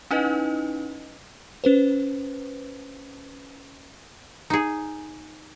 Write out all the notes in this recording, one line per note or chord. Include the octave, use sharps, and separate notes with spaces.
C#4 D#4 E4 B4 D#5
C#4 B4 C5
D#4 G#4